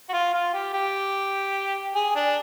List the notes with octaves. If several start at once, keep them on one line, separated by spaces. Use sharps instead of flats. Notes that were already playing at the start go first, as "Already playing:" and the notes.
F#4
F4
F4
G4
G4
G#4
D4